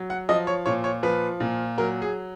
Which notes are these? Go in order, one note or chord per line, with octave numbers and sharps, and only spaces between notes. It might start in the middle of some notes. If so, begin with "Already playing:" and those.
Already playing: F#3
F#5
F3 D#5
C#5
A#2 C#5
C#5
F3 B4
A#2
F#3 A#4
G#4